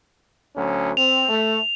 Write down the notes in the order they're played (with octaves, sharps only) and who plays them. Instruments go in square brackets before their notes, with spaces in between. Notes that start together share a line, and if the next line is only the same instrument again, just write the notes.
[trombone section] D2 F#3 C#4
[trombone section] C4 [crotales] F7
[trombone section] A3